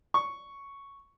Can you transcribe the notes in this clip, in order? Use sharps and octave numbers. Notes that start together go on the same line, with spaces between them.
C#6